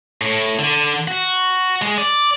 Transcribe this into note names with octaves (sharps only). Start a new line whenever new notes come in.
A2
D3
F#4
G#3
D5